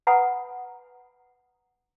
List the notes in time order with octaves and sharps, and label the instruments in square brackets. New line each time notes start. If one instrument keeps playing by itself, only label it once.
[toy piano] B4 F#5 G#5 A#5 B5 D#6